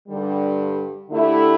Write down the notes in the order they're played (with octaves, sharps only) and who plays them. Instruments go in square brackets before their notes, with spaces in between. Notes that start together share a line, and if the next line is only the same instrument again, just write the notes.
[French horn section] G2 D3 G3
D3 A3 E4 G4